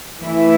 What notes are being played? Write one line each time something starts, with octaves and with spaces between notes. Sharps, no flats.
E3 A3 E4